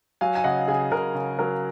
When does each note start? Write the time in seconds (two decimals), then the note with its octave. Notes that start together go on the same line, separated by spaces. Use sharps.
0.21 F#3 F5 G#5
0.35 G#5
0.44 C#3 D#5 F#5
0.68 C#3 G#4
0.91 C#3 A#4
1.15 C#3
1.39 F#3 A#4